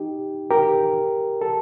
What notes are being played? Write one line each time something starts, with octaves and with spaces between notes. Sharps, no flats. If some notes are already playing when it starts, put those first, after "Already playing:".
Already playing: D#4 G4
G4 A#4
A4